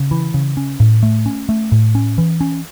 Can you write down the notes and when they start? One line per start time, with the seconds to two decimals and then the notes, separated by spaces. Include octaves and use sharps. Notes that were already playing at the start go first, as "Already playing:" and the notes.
Already playing: C#3
0.11 E3
0.34 C#3
0.57 C#4
0.80 A2
1.03 A3
1.26 C#4
1.49 A3
1.72 A2
1.95 C#4
2.18 E3
2.41 C#4